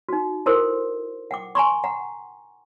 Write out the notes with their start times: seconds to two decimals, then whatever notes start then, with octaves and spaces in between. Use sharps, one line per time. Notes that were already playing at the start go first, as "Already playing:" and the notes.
0.09 D#4 F#4
0.46 E4 A4 A#4 C5 C6
1.31 F#5 G5 D6
1.55 G#5 A#5 C6 C#6
1.84 F#5 G5 A#5